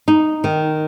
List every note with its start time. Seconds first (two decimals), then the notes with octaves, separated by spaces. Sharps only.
0.08 D#4
0.44 D#3